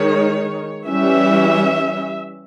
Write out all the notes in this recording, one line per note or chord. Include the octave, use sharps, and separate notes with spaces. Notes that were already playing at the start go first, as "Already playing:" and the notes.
Already playing: D#3 G#3 D#4 C#5
E3 G3 C#4 E5